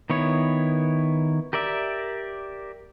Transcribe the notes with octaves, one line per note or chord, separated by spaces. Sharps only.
D#3 B3 E4 C#5
G4 A#4 D5 E5